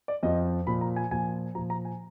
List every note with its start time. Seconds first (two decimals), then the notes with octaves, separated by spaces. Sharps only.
0.08 D5
0.23 F2 F3 D#5
0.67 A#2 F3 B5
0.81 A#5
0.96 G#5
1.11 A#2 F3 G#5
1.55 A#2 F3 A#5
1.70 A#5
1.85 G#5